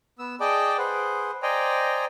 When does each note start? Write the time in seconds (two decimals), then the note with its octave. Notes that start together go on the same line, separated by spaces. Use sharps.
0.19 B3 E6
0.40 G#4 D5 D#5 G5 A5 D6
0.78 G#4 B4 C5 F#5
1.43 C5 D5 D#5 G5 G#5 A#5